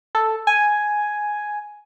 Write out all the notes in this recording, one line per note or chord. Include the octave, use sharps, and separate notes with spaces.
A4
G#5